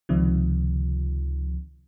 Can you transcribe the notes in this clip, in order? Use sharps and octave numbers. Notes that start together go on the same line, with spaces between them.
C#2 C3 D#3 F3